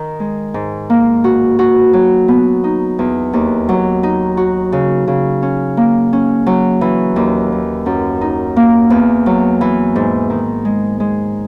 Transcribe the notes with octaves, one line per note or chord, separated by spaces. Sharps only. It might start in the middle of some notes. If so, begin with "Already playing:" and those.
Already playing: D#3
G#3
G#2
A#3
F#4
F#4
F#3
B3
D#4
E2
D#2
F#3
D#4
F#4
C#3
C#3
C#4
A#3
C#4
F#3
E3
D#2
E3
F#2
D#4
A#3
E2
F#3
E3
G#2
D#3
G#3
G#3